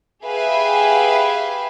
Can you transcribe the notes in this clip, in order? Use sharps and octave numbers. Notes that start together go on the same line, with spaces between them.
G4 G#4 B4 E5 F5 G#5